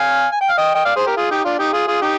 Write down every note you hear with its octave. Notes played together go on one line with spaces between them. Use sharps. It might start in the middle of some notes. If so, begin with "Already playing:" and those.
Already playing: F5 G#5
G#5
G5
F5
D#5 G5
D#5 G5
D5 F5
G#4 C5
G4 A#4
F4 G#4
D#4 G4
D4 F4
D#4 G4
F4 G#4
F4 G#4
D#4 G4